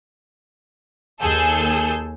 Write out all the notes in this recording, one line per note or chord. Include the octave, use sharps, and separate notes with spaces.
D#2 G#4 A4 E6 G6